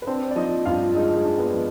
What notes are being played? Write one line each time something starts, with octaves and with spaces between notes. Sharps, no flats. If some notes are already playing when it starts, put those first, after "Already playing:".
B4
C4 D4 C5
D5
F3 D#4 D#5
G2 F4 F5
G#3 D#4 D#5
G#3 G#4
D4
B3 B4
F3